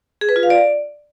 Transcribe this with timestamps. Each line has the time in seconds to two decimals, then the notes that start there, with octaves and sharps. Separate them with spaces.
0.21 G#4
0.29 B4
0.36 F4
0.43 F5
0.50 D5